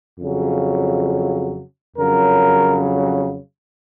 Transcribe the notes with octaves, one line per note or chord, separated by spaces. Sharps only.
F2 C#3 F#3
F2 C#3 F#3 A#4